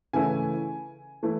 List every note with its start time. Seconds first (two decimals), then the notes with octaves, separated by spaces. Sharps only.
0.13 C#3 E3 A3 E4 G#5
1.23 E3 A3 E4